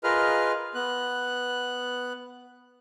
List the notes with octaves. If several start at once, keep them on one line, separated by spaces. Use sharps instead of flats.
F4 G#4 A#4 B4 D#5 F6
B3 F#6